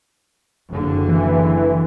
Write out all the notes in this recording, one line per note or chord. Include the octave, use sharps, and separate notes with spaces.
F#1 D3
E3